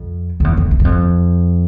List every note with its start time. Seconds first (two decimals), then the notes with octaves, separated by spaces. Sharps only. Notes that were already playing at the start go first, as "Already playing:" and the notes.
Already playing: F2
0.40 F2
0.44 E2
0.57 F2
0.71 E2
0.79 F#2
0.85 F2